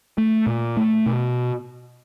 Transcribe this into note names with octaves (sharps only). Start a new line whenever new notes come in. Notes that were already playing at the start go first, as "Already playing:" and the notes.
A3
A#2
A3
B2